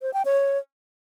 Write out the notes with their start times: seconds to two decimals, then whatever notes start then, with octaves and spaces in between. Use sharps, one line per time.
0.02 C5
0.13 G5
0.25 C#5